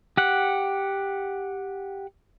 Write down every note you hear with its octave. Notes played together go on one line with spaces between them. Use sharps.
G4 F#5